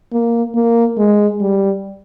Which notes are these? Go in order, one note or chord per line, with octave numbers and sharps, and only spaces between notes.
A#3
A#3
G#3
G3